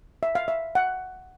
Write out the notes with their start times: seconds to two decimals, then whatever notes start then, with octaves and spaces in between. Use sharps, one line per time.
0.23 E5
0.35 F5
0.48 E5
0.75 F#5